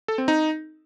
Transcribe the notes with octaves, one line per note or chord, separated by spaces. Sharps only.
A4
C4
D#4